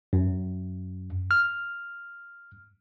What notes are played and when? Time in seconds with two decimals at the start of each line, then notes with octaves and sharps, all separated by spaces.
0.13 F#2
1.31 F6